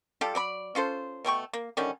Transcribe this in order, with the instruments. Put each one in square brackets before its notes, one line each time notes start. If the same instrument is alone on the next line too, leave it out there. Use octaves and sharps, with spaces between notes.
[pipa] G3 F4 G4 A4
F#3 D5 B5
C#4 F4 A4 C5
B2 A3 G5 C#6
A#3
D3 D#3 G3 C#4